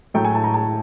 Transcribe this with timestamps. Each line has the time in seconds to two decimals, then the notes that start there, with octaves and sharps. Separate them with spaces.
0.14 A2 F#3 A3 G5
0.25 G#5
0.35 A5
0.44 A#5
0.54 A5